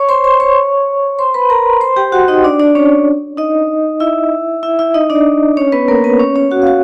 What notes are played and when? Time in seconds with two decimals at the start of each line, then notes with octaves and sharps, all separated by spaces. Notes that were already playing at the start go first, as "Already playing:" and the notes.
Already playing: C#5 C#6
0.09 C5 C6
0.24 C5 C6
0.40 C#5 C#6
1.19 C5 C6
1.34 B4 B5
1.50 A#4 A#5
1.81 C5 C6
1.96 G4 G5
2.12 F#4 F#5
2.28 D#4 D#5
2.44 D4 D5
2.59 D4 D5
2.75 C#4 C#5
3.37 D#4 D#5
4.00 E4 E5
4.63 E4 E5
4.79 E4 E5
4.94 D#4 D#5
5.10 D4 D5
5.57 C#4 C#5
5.72 B3 B4
5.88 A#3 A#4
6.04 B3 B4
6.20 C#4 C#5
6.36 C#4 C#5
6.51 F#4 F#5
6.62 F5
6.67 F#4 F#5